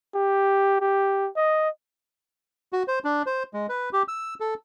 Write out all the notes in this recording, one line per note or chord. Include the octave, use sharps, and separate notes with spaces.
G4
G4
D#5
F#4
C5
D4
C5
G#3
B4
G4
E6
A4